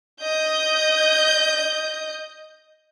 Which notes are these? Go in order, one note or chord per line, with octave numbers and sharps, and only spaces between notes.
D#5 G6